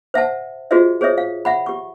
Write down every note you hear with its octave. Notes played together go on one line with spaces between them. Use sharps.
C5 E5 F#5 A5
F4 F#4 G#4 C5 D#5 E5
G#4 C5 C#5 D#5 E5 D#6
F5
E5 F#5 B5
G4 C#6